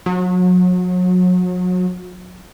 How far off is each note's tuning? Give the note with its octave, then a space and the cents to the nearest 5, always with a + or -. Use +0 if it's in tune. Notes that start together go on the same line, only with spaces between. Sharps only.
F#3 -35